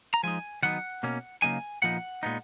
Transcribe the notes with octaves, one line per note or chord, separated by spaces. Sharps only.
A#5
F3 G#3 D#4 G#5
D#3 F#3 B3 D#4 F#5
B2 A#3 C#4
C#3 F#3 A#3 D#4 G#5
A#2 F3 B3 D#4 F#5
A#2 G#3 B3 D#4